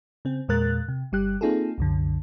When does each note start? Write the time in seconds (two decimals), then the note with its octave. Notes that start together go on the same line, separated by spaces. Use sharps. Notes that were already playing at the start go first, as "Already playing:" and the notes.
0.25 C#3 C4
0.48 E2 A#2 G#3 A#4 F#6 A6
0.88 C3
1.12 G1 G3 G4 F#6
1.41 A#3 C4 D#4 F4 G#4 A4
1.78 C2 F#2 D3